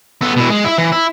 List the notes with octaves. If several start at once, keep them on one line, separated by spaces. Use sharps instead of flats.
B3 A4
B2 E4
G#3
E4 E5
E3
E4